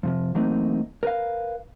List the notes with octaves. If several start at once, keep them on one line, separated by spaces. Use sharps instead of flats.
F2 C3 F3
E3 F#3 A3 A#3 C4 D#4
A#4 B4 F5